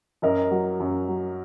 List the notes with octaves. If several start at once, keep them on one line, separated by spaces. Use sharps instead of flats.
F#2 A#4 D#5
F#3
F#2
F#3